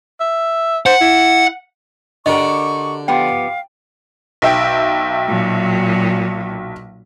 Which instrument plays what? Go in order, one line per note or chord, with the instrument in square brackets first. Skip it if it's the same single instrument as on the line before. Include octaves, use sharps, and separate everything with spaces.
[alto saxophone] E5
[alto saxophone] C5 [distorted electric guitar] F#5
[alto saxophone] E4
[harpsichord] D3 [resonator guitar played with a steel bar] F#4 G4 A#4 [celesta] D#5 [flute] C#6
[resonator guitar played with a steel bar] F3 B3 G4 [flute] F5 [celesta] G5
[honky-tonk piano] B1 E5 G5
[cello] A#2 F#3